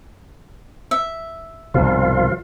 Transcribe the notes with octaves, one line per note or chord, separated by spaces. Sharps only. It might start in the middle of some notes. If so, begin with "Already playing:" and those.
E5
C2 G#2 B2 F3 F4